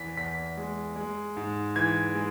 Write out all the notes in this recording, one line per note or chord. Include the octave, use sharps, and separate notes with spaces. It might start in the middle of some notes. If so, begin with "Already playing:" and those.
Already playing: E2 E3 B6
E2 B6
G#3
G#3
G#2
E3 G#6
G#3